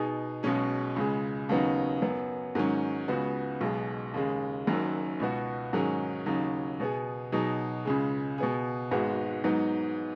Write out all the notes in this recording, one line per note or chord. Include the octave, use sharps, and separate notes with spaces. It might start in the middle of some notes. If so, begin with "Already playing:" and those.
Already playing: B2 B3 D#4 G#4
B1 B2 G#3 C#4 G#4
C#2 C#3 G#3
D#2 C#3 F#3 B3 D#4
F#2 F#3 B3
G#2 D#3 F#3 C#4
C#2 C#3 B3 F#4
B1 B2 G#3
D#2 C#3 G#3
F#1 F#2 D#3 F#3
C#2 B2 B3 F#4
G#2 D#3 F#3 C#4 G#4
D#2 C#3 F#3 D#4
B2 B3 G#4
B2 F#3 D#4 G#4
C#2 C#3 G#3
B2 B3 G#4
G#1 G#2 G#3 B3 F#4
G#2 F#3 B3 D#4